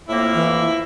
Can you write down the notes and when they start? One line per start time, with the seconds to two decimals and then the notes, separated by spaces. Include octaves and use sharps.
0.08 F2 A2 A#3 E4
0.34 E3